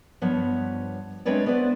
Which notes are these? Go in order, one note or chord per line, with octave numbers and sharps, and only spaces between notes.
G2 F3 B3 C#5 F#5
G#3 C4 D4 B4 C#5 D5
B3 B4 C5 D5